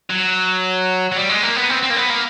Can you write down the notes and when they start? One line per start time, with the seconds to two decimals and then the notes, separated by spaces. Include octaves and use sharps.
0.10 F#3
1.12 F#3
1.16 G3
1.29 G#3
1.43 A#3
1.56 B3
1.70 C4
1.82 C4
1.90 A#3
1.96 B3
2.10 A#3